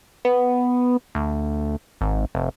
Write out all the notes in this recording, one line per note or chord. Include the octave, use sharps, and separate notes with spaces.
B3
D2
G#1
F1